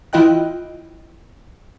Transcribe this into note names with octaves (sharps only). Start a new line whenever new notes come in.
E3 E4 F4 D#5 G5 F#6